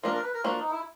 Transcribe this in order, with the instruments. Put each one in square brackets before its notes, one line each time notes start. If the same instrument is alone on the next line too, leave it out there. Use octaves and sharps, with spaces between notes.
[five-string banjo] F3 A#3 D4 [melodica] A#4
[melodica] A#4
B4
A#4
[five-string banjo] F3 A#3 D4 [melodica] F#4
[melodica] D#4
E4